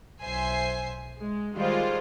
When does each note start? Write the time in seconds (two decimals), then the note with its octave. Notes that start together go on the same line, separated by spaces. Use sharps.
0.21 B1 C5 E5 G#5 C7
1.20 G#3
1.55 D#3 G3 G#3 F4 C5